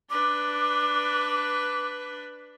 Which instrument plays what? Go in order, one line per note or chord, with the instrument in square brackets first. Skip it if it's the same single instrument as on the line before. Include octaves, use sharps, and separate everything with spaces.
[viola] D4 B4 [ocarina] D6